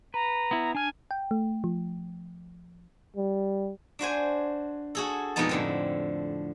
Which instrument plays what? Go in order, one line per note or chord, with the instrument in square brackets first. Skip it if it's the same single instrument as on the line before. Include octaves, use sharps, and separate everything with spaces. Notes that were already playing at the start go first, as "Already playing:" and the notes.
[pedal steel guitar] B4 [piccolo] A#5
[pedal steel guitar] B3 E4
[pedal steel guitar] D4 F6 [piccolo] G#5
[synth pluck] G5
A3
F3
[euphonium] G3
[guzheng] D4 F#4 C5 G#5
F#4 G#4 A4
F2 B2 G#3 B3 D#4 A5
A2 D3 C4